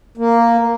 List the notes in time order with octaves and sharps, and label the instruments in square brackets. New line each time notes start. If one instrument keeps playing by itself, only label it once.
[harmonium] A#3